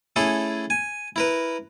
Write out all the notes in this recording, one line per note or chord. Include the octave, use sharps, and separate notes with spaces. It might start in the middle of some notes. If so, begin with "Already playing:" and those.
A3 C#4 E4 G#4 A4
G#5
E4 A#4 B4